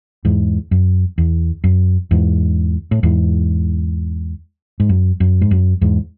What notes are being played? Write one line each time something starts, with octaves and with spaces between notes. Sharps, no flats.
E2 G#2
F#2
E2
F#2
E2 G#2
A2
E2 G#2
G#2
F#2
F#2
G#2
F#2
E2 G#2